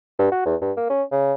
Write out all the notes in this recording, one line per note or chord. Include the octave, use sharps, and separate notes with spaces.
G2
F#4
E2
G2
A#3
C#4
C#3